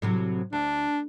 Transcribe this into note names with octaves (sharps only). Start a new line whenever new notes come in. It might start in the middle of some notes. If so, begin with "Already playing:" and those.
A2 C3 F#3
D2 D4